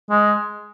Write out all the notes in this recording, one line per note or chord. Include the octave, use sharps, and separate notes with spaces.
G#3